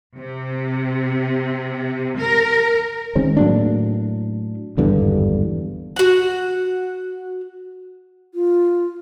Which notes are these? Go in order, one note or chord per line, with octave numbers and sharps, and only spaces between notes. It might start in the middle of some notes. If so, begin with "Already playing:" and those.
C3
A#4
D#3 G#3 C4 C#4
A2 F#3 A#3 D4
G#1 E2 G2 D3
F#4 F#5
F4